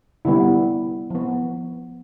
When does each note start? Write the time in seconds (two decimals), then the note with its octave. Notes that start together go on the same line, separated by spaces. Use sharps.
0.25 D3 G3 B3 E4
1.10 F3 B3